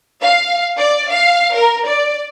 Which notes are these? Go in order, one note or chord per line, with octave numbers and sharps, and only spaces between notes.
F5
D5
F5
A#4
D5